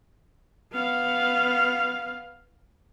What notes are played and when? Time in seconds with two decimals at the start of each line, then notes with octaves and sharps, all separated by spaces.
0.73 B3 F5